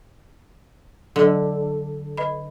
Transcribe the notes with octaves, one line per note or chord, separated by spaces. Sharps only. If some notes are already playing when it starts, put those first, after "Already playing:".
D3 F#3 A4 D#5
B4 D#5 B5